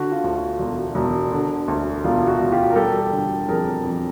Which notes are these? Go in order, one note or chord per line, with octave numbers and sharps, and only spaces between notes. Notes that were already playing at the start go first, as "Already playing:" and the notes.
Already playing: D3 F#4
F4
D2
F#4
E1
E1
D3
D2
E1 F4
F#4
E1
F4 G4
A#4
G3 G4 A4
D3
F2 G#4 A#4
F2